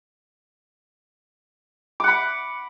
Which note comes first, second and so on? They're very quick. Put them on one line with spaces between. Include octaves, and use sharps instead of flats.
D6 F#5 B5